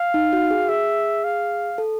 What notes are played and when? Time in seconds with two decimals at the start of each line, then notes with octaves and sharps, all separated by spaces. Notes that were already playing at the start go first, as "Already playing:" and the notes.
Already playing: F5
0.14 D#4
0.33 F#4
0.51 G#4
0.69 G#4 E5
1.24 F5
1.78 A4